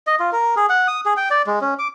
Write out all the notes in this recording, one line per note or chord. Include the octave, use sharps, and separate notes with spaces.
D#5
F4
A#4
G#4
F#5
D#6
G#4
G5
D5
G#3
C#4
D6